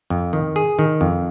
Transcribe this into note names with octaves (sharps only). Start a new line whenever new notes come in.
F2
D#3
G#4
D#3
F2